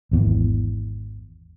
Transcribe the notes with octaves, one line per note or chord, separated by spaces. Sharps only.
G#1 E2